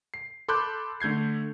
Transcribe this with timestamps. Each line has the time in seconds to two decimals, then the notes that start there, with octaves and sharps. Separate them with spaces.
0.14 C7
0.48 A4 B5 C6 D6 F#6 G6
1.00 D3 A3 G6 G#6 C7